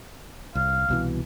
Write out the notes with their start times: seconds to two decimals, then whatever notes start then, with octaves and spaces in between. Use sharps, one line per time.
0.55 C2 F5
0.88 C2 B2 E3